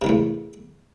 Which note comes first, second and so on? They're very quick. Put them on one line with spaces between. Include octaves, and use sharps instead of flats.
C3 D#3 E2 A2